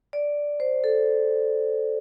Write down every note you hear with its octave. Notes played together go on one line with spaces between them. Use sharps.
D5
C5
A4